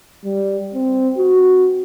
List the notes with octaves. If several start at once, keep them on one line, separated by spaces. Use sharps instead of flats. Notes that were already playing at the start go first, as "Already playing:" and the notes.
G3
C4
F#4